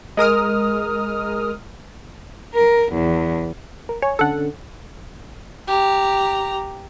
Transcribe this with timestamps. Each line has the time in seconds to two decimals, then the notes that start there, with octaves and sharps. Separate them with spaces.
0.17 G#3 A#4 D#6 F6
2.54 A#4
2.93 E2
3.89 A#4
4.02 C#5 G#5
4.19 D3 C#4 D4 A4 F#5
5.67 G4 A#5